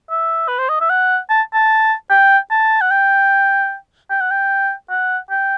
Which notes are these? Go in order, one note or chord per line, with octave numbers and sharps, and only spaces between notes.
E5
B4
C5
D#5
E5
F#5
A5
A5
G5
A5
F#5
G5
G5
F#5
G5
F#5
G5